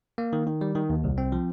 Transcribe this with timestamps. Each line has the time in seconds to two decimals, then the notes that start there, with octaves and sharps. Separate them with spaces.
0.18 A#3
0.33 D#3
0.47 D#3
0.61 G3
0.75 D#3
0.90 D#2
1.04 C2
1.18 C4
1.32 F3